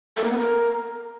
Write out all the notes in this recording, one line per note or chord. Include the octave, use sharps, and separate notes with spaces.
A4
A#3
B3
A#4